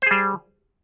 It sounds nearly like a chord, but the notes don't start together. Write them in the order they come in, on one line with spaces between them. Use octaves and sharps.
C5 G#4 G3